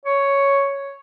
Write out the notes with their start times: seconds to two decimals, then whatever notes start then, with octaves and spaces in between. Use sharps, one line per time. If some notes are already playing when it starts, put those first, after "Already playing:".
0.05 C#5